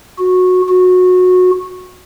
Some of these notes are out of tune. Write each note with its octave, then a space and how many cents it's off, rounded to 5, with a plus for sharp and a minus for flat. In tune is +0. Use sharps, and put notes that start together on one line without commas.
F#4 -15
F#4 -20